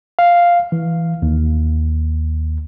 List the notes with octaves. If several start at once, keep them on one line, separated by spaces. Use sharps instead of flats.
F5
E3
D#2